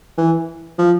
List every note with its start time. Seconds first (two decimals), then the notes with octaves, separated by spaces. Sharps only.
0.18 E3
0.78 F3